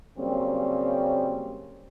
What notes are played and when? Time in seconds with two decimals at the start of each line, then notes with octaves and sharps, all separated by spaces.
0.18 C#3 F#3 G3 A#3 C4 C#4